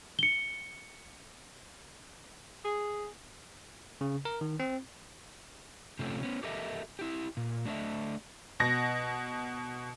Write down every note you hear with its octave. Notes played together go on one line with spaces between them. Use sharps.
C#7 G7
G#4
C#3
A#4
D#3
C4
C3 F3 A3 C#4
B3 C#4
G4 A4 A#4 D#5 E5
E4 G4
A#2
A3 D4 E4 D#5 E5
B2 A#6